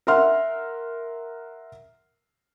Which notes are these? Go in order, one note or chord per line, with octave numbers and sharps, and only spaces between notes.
A#4 E5 F#5 C6 F6